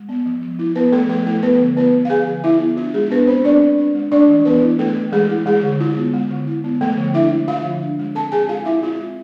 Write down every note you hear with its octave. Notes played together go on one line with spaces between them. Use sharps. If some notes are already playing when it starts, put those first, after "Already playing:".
Already playing: G#3
B3
F3
F3
E4
B3 B4
F3 A3 A4
F3 A3 A4
A3 E4 A4
F3 B3 B4
D3
B3 E4 B4
B3
F5
F3 G#4 G#5
D3
E4 E5
B3
D4 F4
G#3 G#4
B3 D4 B4
G#3 C4 C5
D4 D5
G#3
D4
G#3
A3 D4 D5
E3
E3 B3 B4
E4
A3 A4
E3
E3 G#3 G#4
E4
G#3 G#4
D3
E4 F4
B3
G#3
D3
E4
B3
F3 A3 A4
D3
D4 E4 E5
G#3
F3 F4 F5
D3
D4
G#3
C4 A4 A5
G#3 G#4 G#5
G#3 F4 F5
E4 E5
C4 F4
G#3